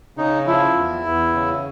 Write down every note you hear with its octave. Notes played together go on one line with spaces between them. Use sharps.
C#3 D#4
F3 E4
E2
E2
C#3